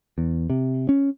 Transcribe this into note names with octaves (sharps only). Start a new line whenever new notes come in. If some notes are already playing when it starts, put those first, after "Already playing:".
E2
C3
C#4